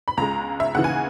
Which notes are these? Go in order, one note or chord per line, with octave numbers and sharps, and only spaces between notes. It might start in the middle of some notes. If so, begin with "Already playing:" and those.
B5
C#2 C#3 G#3 A#5
E5
D#2 C#3 E3 F#5
G#5